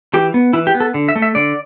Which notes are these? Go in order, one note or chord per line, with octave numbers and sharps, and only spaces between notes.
E3 G4
B3
E3 E4
G4
B3
A4
D3
E5
A3
E5
D3 D5